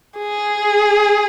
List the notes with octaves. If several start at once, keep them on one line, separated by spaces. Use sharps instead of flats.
G#4